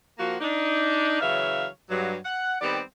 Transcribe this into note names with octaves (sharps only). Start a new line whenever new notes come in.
F3 A#3 F#4
D4 D#4
C#3 E3 F#3 C#5 E5 F5
G2 F#3
F#5
D#3 G3 B3 C4 G4 D5